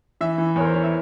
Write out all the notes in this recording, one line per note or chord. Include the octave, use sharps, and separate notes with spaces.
E3 E5
E3
E2 A#4 C#5
C5
E3 C#5
E5